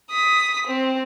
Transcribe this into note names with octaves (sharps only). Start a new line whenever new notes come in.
D#6 B6
C4